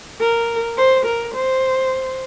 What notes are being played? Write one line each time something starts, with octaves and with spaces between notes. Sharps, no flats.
A#4
C5
A#4
C5